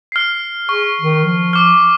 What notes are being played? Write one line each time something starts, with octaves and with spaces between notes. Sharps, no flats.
F6 C7
G#4 C#6
D#3
F3
D6 F6